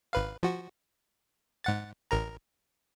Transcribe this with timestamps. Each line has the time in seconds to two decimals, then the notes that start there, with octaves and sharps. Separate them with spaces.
0.13 G#1 B4 F5
0.43 F3 F#4
1.64 G#2 F#5 A6
2.11 A1 A#4 A#5